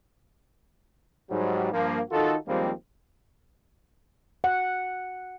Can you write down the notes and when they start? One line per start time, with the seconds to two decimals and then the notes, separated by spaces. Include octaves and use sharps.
1.30 G#2 F#3 G3
1.72 G2 F3 A#3
2.11 D#3 D#4 F4 F#4 A4
2.47 D#2 F3 G3 G#3 A#3 C4
4.44 F#5